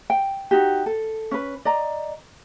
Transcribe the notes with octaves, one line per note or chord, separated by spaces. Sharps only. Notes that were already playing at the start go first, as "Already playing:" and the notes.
G5
D#4 F#4 G4
A4
C#4 B4
D5 D#5 A#5